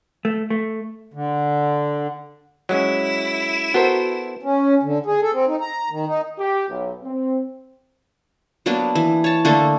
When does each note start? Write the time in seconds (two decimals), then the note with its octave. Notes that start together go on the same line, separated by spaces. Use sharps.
0.25 A3
0.50 A3
1.14 D3
2.69 F#3 G#3 C#4 E4 E7
3.74 B3 F#4 A4 A#4 C5
4.43 C#4
4.83 D3
5.06 G#4
5.21 A4
5.33 C4
5.48 D#4
5.61 A#5
5.90 D#3
6.07 D#4
6.39 G4
6.69 B1
7.04 C4
8.66 F#3 A#3 B3 D4
8.95 E3
9.24 C#5 A5
9.45 D3 A3 A#3 A4